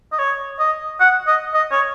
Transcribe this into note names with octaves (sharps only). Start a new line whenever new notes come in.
D#5
C#5
D#5
F#5
D#5
D#5
C#5